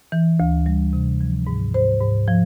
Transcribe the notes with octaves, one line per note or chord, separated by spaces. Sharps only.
E3
D2
G3
C3
F3
G#2
G#2 C5
G#2
F3